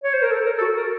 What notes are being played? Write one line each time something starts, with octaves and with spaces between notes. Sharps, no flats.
C#5
C5
A#4
A4
A#4
A4
F#4
A#4